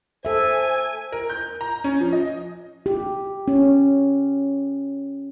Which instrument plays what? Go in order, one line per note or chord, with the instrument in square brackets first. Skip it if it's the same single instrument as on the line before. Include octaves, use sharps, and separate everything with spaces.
[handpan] A4 E5 [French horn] C5 [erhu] G#5
[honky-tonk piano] A#4
G6
A#5
C#4
F3
D#5
[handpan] G4
C#4